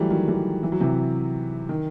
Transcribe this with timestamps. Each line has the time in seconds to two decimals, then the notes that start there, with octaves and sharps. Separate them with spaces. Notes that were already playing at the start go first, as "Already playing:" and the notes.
Already playing: E3 F#3 G3 A3
0.10 D#3 F#3
0.28 E3 G3
0.63 E3
0.72 F#3
0.80 C3 E3
1.69 D#3